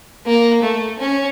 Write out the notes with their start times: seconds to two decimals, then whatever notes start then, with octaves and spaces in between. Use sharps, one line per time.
0.26 A#3
0.63 A3
0.99 C#4